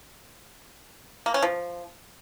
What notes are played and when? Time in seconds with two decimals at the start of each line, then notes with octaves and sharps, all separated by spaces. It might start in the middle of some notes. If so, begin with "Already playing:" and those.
1.26 A#3
1.34 C#4
1.42 F3